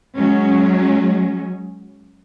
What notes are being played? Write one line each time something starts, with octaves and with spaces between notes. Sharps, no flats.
F#3 G#3 C#4